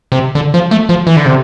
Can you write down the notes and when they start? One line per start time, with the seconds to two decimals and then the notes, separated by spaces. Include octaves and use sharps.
0.12 C3
0.35 D3
0.54 F3
0.71 A3
0.89 F3
1.07 E3
1.16 D3
1.26 C3